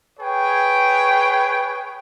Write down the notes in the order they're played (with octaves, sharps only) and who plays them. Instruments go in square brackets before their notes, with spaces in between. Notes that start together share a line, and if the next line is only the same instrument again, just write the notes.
[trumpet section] G#4 B4 C#5 G5